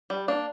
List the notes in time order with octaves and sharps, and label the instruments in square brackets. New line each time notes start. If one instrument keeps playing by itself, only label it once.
[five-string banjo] G3
A#3 D4